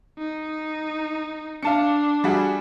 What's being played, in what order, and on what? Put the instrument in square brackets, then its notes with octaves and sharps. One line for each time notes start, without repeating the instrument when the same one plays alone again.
[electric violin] D#4
[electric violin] D4 [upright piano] F5 A5 C#7
[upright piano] G3 F#4 G#4